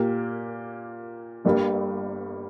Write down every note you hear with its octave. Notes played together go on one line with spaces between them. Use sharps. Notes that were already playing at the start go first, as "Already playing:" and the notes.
Already playing: A#2 A#3 G4 A#4
G1 G2 G3 A#3